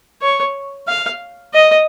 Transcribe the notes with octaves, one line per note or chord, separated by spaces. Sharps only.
C#5
F5
D#5